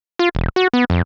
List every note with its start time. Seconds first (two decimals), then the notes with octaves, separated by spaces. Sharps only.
0.19 F4
0.35 E1
0.56 F#4
0.73 B3
0.90 F2